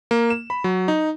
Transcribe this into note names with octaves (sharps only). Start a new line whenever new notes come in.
A#3
E7
B5
F#3
D#4